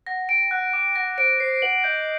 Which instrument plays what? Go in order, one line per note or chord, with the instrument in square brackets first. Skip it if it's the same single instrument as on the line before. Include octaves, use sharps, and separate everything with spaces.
[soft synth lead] F#5 [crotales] A#6
[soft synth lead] G5 [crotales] D7
[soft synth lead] F#5 [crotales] F#6
[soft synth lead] G5 [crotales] D6
[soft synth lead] F#5 [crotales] A#6
[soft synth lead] C5 [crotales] D7
[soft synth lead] C5 [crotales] C7
[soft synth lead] F#5 [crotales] F#7
[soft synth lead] D#5 [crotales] G6